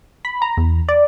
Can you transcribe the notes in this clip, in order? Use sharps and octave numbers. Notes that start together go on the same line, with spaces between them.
B5
A#5
E2
D5